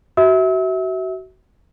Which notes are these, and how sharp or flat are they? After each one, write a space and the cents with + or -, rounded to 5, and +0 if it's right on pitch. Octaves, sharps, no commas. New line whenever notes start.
F#4 +25 E5 -20 E6 -40